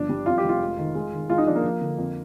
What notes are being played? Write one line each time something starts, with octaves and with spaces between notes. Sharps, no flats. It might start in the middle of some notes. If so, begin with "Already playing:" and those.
Already playing: G1 F3 D4
G3
F2 F4
G4
F1
F4
G#3
D#3
G#3
D#3
G#3 F4
D#4
F3 D4
A#3
F3
D3
F2